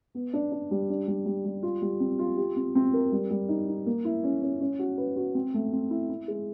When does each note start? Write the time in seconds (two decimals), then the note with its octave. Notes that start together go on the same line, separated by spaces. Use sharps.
0.15 B3
0.33 D4
0.52 D4
0.71 G3
0.90 D4
1.08 G3
1.26 G3
1.45 G3
1.63 F4
1.82 G3
2.00 C4
2.19 F4
2.37 G4
2.56 C4
2.75 C4
2.93 A#4
3.12 G3
3.30 G3
3.49 D#4
3.68 D#4
3.86 A#3
4.05 E4
4.23 C#4
4.42 C#4
4.60 C#4
4.79 F#4
4.98 B4
5.17 F#4
5.35 C4
5.54 A3
5.72 C4
5.90 E4
6.09 E4
6.28 G#3